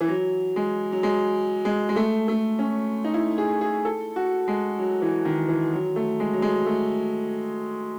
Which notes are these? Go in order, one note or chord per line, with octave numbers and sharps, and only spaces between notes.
E3
F#3
G#3
F#3
G#3
G#3
G#3
A3
A3
C#4
D#4
E4
G#4
G#4
A4
F#4
G#3
F#3
E3
D#3
E3
F#3
A3
G#3
F#3
G#3
A3